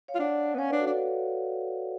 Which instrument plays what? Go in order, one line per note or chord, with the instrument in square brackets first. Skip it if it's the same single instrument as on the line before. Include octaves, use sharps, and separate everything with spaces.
[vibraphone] C#5 F5
[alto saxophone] F4
[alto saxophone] D4 [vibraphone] D5 F#5
[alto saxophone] B3
[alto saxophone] C#4 [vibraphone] C#5 F5
[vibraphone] B4 D5
[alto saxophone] D4
[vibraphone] F#4 A4
[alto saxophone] D4